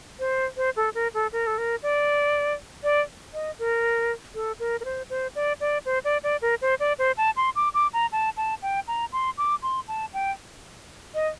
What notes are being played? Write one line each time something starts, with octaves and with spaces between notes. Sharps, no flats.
C5
C5
A4
A#4
A4
A#4
A4
A#4
D5
D5
D#5
A#4
A4
A#4
A#4
C5
C5
D5
D5
C5
D5
D5
A#4
C5
D5
C5
A5
C6
D6
D6
A#5
A5
A5
G5
A#5
C6
D6
C6
A5
G5
D#5